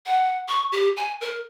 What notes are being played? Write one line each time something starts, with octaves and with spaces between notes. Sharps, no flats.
F#5
C#6
G4
G#5
A#4